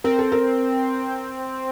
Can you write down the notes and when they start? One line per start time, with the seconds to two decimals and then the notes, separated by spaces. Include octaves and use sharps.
0.04 C4 A#4
0.19 A4
0.32 A#4